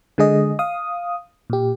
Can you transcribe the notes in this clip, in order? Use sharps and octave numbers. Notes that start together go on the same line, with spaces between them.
D3 G#3 G#4 D#5
F5 D#6
A#2 G4